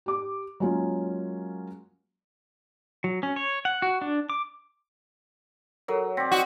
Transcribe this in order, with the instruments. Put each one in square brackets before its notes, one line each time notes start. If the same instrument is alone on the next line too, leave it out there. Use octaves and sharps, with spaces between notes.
[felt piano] G4 D6
F#3 G#3 A#3 C#4 F4
[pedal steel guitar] F#3
C#4
C#5
F#5
F#4
D4
D6
[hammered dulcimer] F#3 [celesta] A4 A#4 C#5
[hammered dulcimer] C4 D5 [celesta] G5 A#6 B6
[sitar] F#4 [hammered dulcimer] D#5